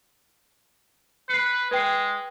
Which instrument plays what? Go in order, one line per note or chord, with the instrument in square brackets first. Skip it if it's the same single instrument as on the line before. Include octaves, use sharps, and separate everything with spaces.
[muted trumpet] B4 [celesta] C7 C#7
[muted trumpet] G#3 [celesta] B4 G5 C7